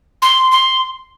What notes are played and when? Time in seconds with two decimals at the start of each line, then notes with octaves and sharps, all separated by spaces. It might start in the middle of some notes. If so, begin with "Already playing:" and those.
0.22 C6
0.51 C6